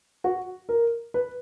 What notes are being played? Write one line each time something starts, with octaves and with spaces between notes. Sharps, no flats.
F#4
A#4
B4